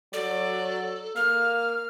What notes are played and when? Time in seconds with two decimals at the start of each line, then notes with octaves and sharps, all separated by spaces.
0.13 F#3 A4 D5
1.16 A#3 F5 F6